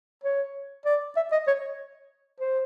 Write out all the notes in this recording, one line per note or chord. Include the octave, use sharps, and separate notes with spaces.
C#5
D5
E5
D#5
C#5
C5